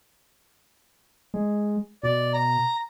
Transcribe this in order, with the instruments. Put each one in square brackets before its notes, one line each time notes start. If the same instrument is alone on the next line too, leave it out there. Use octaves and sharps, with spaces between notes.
[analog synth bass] G#3
[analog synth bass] B2 [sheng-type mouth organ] D5
[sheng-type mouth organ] A#5